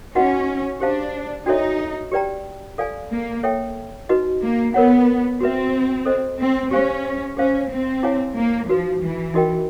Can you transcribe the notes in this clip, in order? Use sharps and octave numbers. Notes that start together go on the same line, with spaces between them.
C#4 D#4 F#4 B4 D#5 F#5
D4 G4 C5 F5 A5
D4 D#4 F#4 A4 C#5 E5
G4 B4 D5 G5 A#5
A4 D5 F5 G#5
A#3
A4 C#5 E5 G5
D#4 F#4 B4 D#5
A#3
B3 A#4 C#5 F#5
C4 F#4 B4 E5
A4 C5 D#5
C4
C#4 G4 C5 F5 G#5 C#6
C#4 G#4 C5 F5
C4
E4 G#4 C#5 F5 G#5
A#3
F3 D#4 F#4 B4
E3
D#4 F#4 A#4 D#5 G5